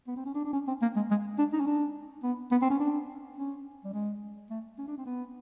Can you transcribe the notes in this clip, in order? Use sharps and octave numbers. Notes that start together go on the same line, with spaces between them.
B3
C4
C#4
D4
D4
C#4
C4
A#3
G#3
G#3
D4
D#4
C#4
D4
B3
B3
C4
C#4
D4
C#4
G3
G#3
A3
C#4
D4
C4
B3